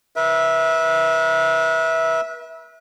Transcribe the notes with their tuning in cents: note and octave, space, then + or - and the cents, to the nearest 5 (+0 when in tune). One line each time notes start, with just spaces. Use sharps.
B4 -40 E5 -15